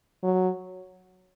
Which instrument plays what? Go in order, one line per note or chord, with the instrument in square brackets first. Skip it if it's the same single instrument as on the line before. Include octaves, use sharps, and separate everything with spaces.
[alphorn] F#3